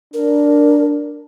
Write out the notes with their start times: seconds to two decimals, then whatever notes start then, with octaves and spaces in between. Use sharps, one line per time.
0.14 D4 A#4